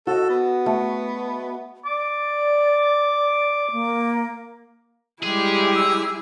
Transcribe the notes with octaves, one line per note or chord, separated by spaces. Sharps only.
F#4 A4 D#5
B3
A3
D5 D6
A#3
G3 G#3 E4 G4 G#4
E6